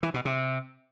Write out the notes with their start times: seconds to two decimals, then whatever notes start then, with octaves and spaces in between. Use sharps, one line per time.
0.03 E3
0.14 B2
0.25 C3